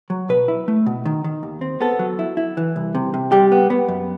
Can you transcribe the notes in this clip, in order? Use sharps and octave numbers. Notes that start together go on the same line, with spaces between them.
F#3
B2 B4
E4
A3
B2
D#3
D#3
D#2
C4
B3 A4
F#3
E4
E4
E3
C2
C3
C3
G3 G4
B3
B3
F#2